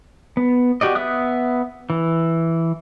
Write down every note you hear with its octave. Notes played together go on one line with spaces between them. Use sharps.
B3
F#4 G4 D5 D#5
B3 E5 D#6 F#6
E3